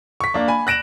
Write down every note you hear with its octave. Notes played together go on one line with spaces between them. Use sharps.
C#6 B6
A#3 D4
G#5 B5
F#6 A#6 D7 E7 F#7